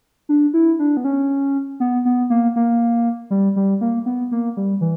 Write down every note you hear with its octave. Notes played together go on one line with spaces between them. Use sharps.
D4
E4
D4
B3
C#4
B3
B3
A#3
A#3
G3
G3
A#3
B3
A#3
G3
E3